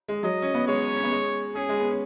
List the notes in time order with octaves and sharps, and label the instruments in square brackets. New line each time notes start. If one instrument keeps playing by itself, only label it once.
[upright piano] G#3
[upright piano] F#3 [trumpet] D#5
[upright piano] C#4
B3
[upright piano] G#3 [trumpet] C#5
[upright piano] C#4
B3
G#3
[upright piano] C#4 [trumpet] G#4
[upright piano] G#3
B3
C#4